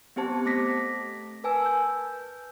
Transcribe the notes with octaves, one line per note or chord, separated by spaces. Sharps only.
B3 C4 G4 C5 A5
A3 D6 A#6 B6
A#4 B4 G#5 A5 E6
G6